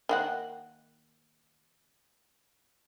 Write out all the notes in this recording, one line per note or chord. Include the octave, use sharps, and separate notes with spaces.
D#3 A#3 F#5